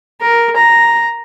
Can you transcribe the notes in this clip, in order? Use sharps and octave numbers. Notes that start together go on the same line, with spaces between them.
A#4
A#5